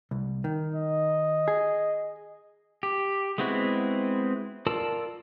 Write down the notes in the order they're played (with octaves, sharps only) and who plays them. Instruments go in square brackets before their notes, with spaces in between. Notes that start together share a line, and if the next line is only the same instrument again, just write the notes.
[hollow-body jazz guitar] C2
D#3
[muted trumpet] D#5
[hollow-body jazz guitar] G#4
[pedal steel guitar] G4
G#3 B3 C4 E4 F#4
F4 A#4 D5 A5 E6